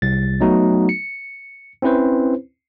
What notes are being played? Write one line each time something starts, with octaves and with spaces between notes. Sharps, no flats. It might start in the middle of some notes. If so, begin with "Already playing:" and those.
C2 A6
F#3 A3 B3 D#4 F#4
C#7
C4 C#4 E4 B4 C5